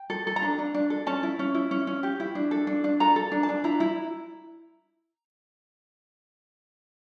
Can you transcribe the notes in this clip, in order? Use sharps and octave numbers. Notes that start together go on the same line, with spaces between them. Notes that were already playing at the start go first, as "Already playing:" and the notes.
Already playing: G5
A4
A4
A#5
D4 A5
D4
D4
A4
C#4 A5
E4
C#4
E4
C#4
C#4
G4
E4
D4
A4
D4
D4
A4 A#5
A4
D4
A5
D4
E4 A#5
E4